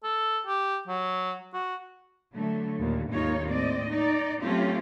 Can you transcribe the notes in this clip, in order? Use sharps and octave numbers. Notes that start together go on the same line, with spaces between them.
A4
G4
F#3
F#4
D3 F#3 A3
D#2 A#2
D#2 G#2 D#4 F4 C#5
A2 C4 D5 D#5
D#4 D5
F#3 A3 C4 C#4 F4 G4